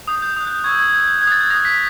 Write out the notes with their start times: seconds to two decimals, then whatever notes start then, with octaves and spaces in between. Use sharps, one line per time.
0.07 D#6 G6
0.22 G6
0.36 D#6 F#6
0.47 G6
0.64 C#6 E6 G6 G#6
0.79 G#6
0.93 C#6 E6 G6 G#6
1.07 G6
1.22 F#6 G#6
1.27 D#6 A6
1.41 G#6
1.50 D#6 F#6 A#6
1.65 B6